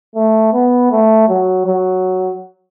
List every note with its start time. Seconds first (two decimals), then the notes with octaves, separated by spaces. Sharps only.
0.16 A3
0.53 B3
0.91 A3
1.28 F#3
1.66 F#3